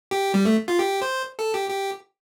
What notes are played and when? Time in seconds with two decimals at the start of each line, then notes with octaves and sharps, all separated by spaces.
0.11 G4
0.34 G3
0.45 A3
0.68 F4
0.79 G4
1.02 C5
1.39 A4
1.54 G4
1.70 G4